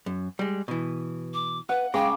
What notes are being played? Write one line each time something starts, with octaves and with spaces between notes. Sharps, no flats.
F#2
G3 G#3
B2 E3
D6
B4 F#5
C#3 G#3 G5 D6